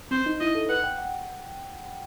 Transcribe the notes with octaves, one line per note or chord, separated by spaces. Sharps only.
C4 C5
D#4
E4 D#5
A4
B4 F#5
G5
F#5